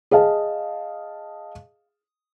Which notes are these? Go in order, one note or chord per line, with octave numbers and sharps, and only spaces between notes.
G#4 D#5 F5 A5